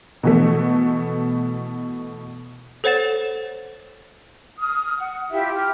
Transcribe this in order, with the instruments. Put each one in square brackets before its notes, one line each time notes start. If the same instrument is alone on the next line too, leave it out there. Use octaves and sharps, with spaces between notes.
[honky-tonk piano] B2 E3 A3
[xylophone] A4 C5 C#5 F#5 A6 E7
[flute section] D#6 F6
F#5
E4 F4 G4 E5
G4 F6